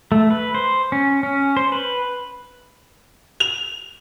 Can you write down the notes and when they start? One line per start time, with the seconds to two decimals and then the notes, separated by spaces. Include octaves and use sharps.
0.12 A3
0.30 B4
0.54 C5
0.92 C#4
1.23 C#4
1.57 C5
1.72 B4
3.40 F7